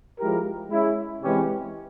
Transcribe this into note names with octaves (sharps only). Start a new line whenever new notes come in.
F3 G#3 E4 G4 A#4
G#3 C#4 E4
C3 E3 G#3 C#4 G4